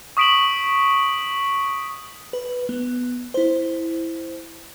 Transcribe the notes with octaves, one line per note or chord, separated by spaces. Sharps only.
C#6 D#6 B6 D7 E7 F#7
B4
B3
E4 C5